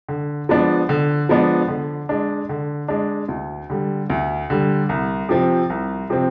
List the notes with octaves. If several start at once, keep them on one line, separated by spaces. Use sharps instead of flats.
D3
F3 G#3 B3 D4
D3
F3 G#3 B3 D4
D3
G#3 D4
D3
G#3 D4
D2
D3 G3
D2
D3 G3
C2
C3 F3 C4
C2
C3 F3 C4